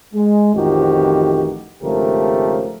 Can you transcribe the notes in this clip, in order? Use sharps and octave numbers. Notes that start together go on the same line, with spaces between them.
G#3
A1 F2 D#3 F3 F#4 G4
G#1 C#3 F3 A3 G4 A#4